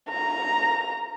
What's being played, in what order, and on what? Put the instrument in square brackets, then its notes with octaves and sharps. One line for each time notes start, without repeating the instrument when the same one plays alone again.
[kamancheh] A#5